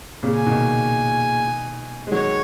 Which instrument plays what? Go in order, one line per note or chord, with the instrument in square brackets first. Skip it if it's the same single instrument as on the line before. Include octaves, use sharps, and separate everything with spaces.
[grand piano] A#2 C#3
[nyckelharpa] G#5
[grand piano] B2 D#3
G#3
[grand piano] D#3 F#3 [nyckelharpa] C#5